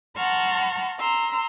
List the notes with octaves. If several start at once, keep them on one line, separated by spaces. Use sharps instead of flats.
F#5 A5 A#5 C6 C#6 F6
A#5 C6 E6